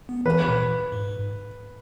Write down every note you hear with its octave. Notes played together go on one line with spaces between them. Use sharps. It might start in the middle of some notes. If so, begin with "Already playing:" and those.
B3
E3 B4
A#2
G#2